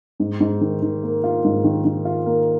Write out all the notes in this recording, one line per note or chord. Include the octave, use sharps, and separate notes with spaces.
G#2
G#2
D#3
D#3
A#3
F4
G#2
D#3
D#3
F4
A#3